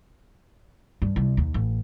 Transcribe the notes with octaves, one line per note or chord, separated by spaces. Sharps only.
G2
C2
D#2
A1